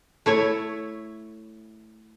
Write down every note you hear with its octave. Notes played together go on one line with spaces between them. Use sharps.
A3 E4 C#5